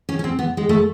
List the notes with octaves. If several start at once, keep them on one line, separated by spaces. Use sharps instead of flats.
C#4
C#4
C4
B3
G#3
A3